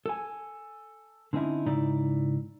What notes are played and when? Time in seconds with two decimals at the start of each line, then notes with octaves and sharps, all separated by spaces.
0.06 A4 G#5
1.33 D3 C4 C#4 D#4 E4
1.66 G#2 C#3 D#4 E4 D5